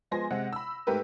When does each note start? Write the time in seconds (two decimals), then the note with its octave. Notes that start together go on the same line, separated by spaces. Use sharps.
0.11 F3 G#3 B3 G#5 C6 A#6
0.31 C3 G#3 F#5
0.53 B5 E6
0.87 G#2 A3 G4 A#4 B4